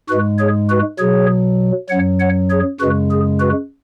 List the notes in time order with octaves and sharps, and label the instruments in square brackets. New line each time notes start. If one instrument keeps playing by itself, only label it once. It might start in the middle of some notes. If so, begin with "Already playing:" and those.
[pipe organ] G#2 G#3 F#4 B4
G#4 C#5
F#4 B4
B2 F#3 G#4 C#5
F#2 F#3 C#5 F#5
C#5 F#5
G#4 C#5
F#2 C#3 G#3 F#4 B4
G#4
F#4 B4